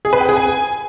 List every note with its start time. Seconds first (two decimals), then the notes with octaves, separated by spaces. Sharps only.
0.05 G#4
0.13 B4
0.21 G5
0.29 G#4
0.37 G#5